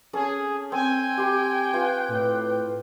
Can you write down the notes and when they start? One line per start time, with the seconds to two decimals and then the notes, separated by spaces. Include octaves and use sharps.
0.13 C#4 G#4 A4 D#6
0.72 C4 A4 G5 G#5
1.18 G4 C6
1.74 F4 B4
2.09 A2